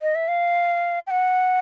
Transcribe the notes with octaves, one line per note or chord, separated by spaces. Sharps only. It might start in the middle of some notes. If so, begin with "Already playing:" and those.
D#5
E5
F5
G5
F#5